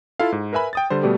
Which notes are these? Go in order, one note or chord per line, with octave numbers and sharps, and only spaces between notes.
E4 F4 A4 F5
G#2
A#4 B4 E5 G#5 B5
G5 D#6 A6
D3 G3 C5
B2 G3 A3 G4